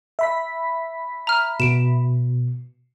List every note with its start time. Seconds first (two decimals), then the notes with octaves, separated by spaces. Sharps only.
0.19 E5 B5 B6
1.27 A#5 F6
1.60 B2 D7 E7